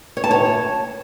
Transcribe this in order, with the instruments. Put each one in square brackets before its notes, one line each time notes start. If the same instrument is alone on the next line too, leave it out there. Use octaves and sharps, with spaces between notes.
[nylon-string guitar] C#5
A5
C#5